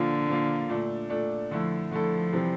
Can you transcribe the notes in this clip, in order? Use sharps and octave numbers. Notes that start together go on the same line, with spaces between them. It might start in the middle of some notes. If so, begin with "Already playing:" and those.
Already playing: A#2 D3 F3 A#3 F4
A#2 F3 A#3 F4
A#2 A3 D4 A4
A#2 A3 D4 A4
D3 F3 A3 E4 A4
D3 F3 A3 E4 A4
C3 E3 G3 C4